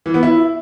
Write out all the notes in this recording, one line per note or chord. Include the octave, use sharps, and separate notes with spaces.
E3
B3
E4